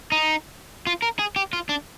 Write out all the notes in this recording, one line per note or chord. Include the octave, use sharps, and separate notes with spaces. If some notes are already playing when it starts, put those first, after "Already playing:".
D#4
F4
A#4
G#4
G4
F4
D4